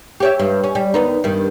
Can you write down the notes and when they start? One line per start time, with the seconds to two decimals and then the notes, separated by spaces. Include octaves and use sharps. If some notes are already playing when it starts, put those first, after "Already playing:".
0.20 G4 C#5 E5
0.39 G2
0.64 C#4
0.75 G3
0.94 D#2 B3 D#4
1.24 G2 D#3